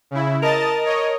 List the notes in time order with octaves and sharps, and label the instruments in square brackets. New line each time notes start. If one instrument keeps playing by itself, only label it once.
[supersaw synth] C#3 E4
[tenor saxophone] A#4 [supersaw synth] D#5 A5 A6
[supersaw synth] C#5 D#5